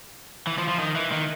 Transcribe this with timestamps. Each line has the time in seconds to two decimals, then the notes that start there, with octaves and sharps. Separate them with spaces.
0.47 E3
0.58 F3
0.68 F3
0.79 D#3
0.95 E3
1.12 D#3